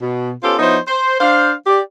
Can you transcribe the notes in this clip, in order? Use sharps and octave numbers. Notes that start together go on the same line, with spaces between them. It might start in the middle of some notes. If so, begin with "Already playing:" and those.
B2
B3 C#4 F4 G4 A4 C5
F3 B3 D#4 E4 C5 C#5
C5
D4 C5 F5
G4 D5